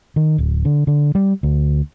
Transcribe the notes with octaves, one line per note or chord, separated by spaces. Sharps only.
D#3
D1
D3
D3
G3
D2